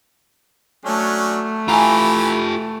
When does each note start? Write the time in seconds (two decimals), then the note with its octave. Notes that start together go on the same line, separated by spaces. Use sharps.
0.85 F#3 A3 C#4 D4
1.68 E3 F4 G4 G#5 A#5 B5